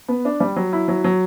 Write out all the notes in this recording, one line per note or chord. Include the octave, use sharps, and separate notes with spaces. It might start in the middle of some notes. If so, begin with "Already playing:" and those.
B3
D4
G3
F#3
E4
F#3
F#3